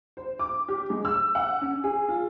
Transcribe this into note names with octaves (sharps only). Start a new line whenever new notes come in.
C5
D6
G4
G#3
E6
F#5
C#4
G#4
F4